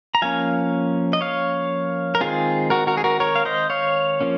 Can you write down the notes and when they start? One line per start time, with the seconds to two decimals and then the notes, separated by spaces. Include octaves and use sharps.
0.15 A#5
0.22 F3 A#3 C#4 F5 G#5
1.13 D#5
1.21 C#5 F5
2.15 A#4
2.21 D#3 G#3 C4 F4 G#4
2.70 F#4 A#4
2.87 F#4 A#4
2.97 G#4
3.04 F#4 A#4
3.20 A#4 C#5
3.35 F5
3.45 C5 D#5
3.70 C#5 F5
4.21 F3 A#3 C#4